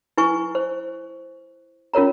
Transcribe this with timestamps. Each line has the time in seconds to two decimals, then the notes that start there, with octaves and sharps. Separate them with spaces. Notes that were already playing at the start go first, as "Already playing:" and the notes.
0.18 E4 B4 G#5 C#6
0.55 C5
1.94 C#4 F4 A#4 C#5 A#5